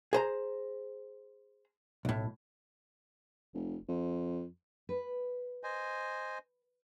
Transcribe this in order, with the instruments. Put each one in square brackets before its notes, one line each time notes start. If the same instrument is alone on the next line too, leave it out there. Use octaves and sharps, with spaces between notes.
[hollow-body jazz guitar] G#4 C5 A#5
B1 A2
[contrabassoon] F1
F2
[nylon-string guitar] B4
[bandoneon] C5 D#5 G#5